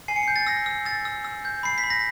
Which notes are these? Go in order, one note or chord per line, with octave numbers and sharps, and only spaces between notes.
G#5 C7
C#7
G6 C7
A6
E6 A#6
E6
E6 A6
E6
E6
G6
B5 C7
B6
B5
A#6